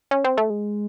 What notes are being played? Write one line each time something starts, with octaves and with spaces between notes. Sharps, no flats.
C#4
C4
A3
G#3